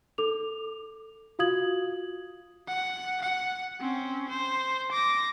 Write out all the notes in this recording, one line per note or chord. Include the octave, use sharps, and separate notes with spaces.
A4 D6 F7
F4 F#4 F5 D#6 G#6 F#7
F#5
F#5
C4 C#4
C5
D6 A#6